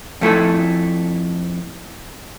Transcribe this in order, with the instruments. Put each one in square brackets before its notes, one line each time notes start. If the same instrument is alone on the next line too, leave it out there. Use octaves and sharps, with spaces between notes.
[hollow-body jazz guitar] F2 A3 E4 A4